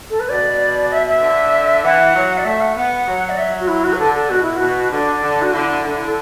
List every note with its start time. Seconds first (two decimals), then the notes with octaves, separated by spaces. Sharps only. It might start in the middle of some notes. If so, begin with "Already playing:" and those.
0.10 A4
0.20 B4
0.29 B2 D5
0.92 E5
1.07 E5
1.22 D3
1.83 E3 F#5
2.14 F#3
2.38 D5
2.45 A3 E5
2.61 F#5
2.76 B3 F#5
3.07 F#3
3.30 D5
3.37 E5
3.60 F#4
3.68 E4
3.84 F#4
3.93 B4
3.99 D3 A4
4.14 A4
4.30 B2 F#4
4.43 E4
4.57 B2 F#4
4.92 D3 D4
5.22 D3
5.42 F#4
5.53 D3 E4
5.84 D3
6.06 A4